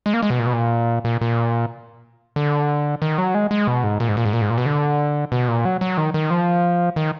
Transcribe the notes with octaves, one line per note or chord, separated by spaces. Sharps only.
G#3
A#3
G#3
B2
A#2
B2
A#2
A#2
A#2
D3
D#3
F#3
G#3
G#3
B2
G#2
A#2
G#2
A#2
G#2
A#2
G#2
A#2
B2
D3
B2
A#2
F#3
F#3
D#3
D#3
F3
D#3